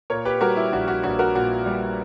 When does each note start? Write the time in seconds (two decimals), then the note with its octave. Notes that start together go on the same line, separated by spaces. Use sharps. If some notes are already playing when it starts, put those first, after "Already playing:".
0.10 A#2 A#4 C#5
0.25 G4 B4
0.41 G3 F#4 A#4
0.57 E4 G4
0.73 A#1 F#4
0.88 F#4
1.03 A#1 F#4
1.19 F#4 A#4
1.35 A#2 F#4
1.66 G3